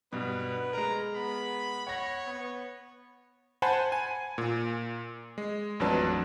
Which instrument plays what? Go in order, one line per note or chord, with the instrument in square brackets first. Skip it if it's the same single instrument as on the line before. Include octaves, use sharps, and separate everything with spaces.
[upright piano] G2 B2 [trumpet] B3 [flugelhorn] B4
[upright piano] G#3 A#4 [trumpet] A#5
[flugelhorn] B3 [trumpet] B5
[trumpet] C#5 [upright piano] F#5 A#6
[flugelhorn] B3
[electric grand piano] C5 F#5 G#5 A5 B5 C6
G#5
A#2
G#3
A1 F2 F#3 D4 B4 A5